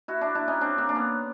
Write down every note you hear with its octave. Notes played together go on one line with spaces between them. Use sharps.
E4 F#4
D4 E4
D4 E4
C#4 D#4
C4 D4
A#3 C4
D4
B3 C#4